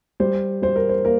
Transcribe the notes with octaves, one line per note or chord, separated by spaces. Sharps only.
G3 C5
G3 C5
A#4
C5
A#3 A#4